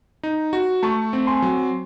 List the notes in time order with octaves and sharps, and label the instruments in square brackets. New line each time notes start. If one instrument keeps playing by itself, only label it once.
[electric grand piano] D#4
F#4
[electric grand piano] A3 [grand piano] A5 C#6
[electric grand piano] C4
[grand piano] G#5 C6
[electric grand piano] F#3